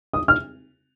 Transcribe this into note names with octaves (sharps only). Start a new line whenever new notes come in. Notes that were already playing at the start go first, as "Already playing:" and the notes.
D#6
F6